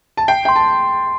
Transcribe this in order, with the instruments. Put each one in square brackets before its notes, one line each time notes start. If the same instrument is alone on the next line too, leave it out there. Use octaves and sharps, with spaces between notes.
[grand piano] A5
[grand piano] G5 [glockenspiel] C7
[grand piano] G5 [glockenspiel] C6
[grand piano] A5